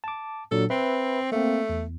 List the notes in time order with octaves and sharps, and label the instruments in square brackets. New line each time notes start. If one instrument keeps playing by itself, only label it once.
[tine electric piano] A5 D6
[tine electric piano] A#2 F#3 D4 [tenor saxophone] A4
[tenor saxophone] C4 [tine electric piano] B4 E5 B5
[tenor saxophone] A3 [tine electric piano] A#3 C4
[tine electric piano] E2